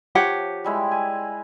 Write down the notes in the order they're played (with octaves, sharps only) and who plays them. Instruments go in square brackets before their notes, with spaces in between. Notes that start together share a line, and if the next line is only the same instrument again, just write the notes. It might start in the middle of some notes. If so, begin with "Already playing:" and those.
[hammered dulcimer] F3 [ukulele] G4 C#5 F#5
[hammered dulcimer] G3 G#3 E4
G#5